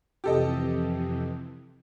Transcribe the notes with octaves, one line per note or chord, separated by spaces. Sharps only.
F2 C3 E3 G4 A4 D#5